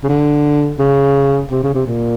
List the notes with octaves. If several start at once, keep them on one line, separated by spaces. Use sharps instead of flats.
C#3
D3
C#3
C3
C#3
C3
A#2